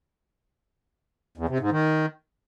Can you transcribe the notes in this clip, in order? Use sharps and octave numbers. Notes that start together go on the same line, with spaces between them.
E2
C3
G#2
D#3